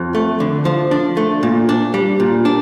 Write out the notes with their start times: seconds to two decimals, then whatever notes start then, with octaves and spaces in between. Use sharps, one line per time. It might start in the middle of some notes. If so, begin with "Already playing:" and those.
Already playing: F2
0.15 A3
0.40 D3
0.65 F3
0.91 D4
1.17 A3
1.43 A#2
1.69 D4
1.94 G3
2.20 A#2
2.45 D4